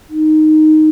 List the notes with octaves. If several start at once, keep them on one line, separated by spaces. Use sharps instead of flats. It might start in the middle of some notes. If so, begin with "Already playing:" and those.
D#4